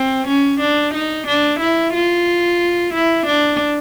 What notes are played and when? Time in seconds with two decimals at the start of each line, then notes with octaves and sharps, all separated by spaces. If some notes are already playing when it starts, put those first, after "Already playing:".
Already playing: C4
0.27 C#4
0.60 D4
0.94 D#4
1.27 D4
1.60 E4
1.93 F4
2.93 E4
3.26 D4